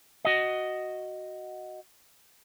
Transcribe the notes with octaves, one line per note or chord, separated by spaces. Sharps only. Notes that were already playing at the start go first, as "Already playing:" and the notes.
F#4 D#5